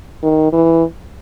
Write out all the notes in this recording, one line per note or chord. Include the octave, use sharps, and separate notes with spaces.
D#3
E3